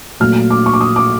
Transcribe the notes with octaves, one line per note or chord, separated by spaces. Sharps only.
A#2 F#3 A3 F6
D6
C#6
D6
D#6
D6